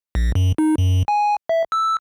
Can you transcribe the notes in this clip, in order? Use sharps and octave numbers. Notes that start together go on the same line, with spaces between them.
A#1
F#2
D#4
F#2
G#5
E5
E6